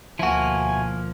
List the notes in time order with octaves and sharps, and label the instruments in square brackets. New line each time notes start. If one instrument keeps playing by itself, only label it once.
[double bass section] D2 B2 [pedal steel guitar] F3 A#3 [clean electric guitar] E4 F#4 [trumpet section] G#5